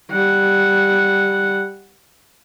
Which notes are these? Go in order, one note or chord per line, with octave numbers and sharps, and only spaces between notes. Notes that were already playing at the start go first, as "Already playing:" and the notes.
G3 F#5